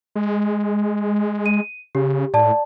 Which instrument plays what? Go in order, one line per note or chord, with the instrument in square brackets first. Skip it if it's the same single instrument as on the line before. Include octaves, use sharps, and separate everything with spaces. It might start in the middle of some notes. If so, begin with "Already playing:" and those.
[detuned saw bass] G#3
[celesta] D#7
[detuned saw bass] C#3 [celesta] G4
[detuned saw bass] A2 [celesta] D5 A5